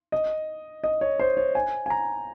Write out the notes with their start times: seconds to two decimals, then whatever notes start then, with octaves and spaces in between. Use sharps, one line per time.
0.12 D#5
0.84 D#5
1.01 C#5
1.19 C5
1.37 C#5
1.55 G#5
1.86 G#5
1.90 A#5